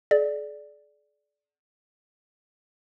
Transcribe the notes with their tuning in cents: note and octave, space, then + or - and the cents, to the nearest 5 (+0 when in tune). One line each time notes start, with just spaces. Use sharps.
G#4 +45 D5 +0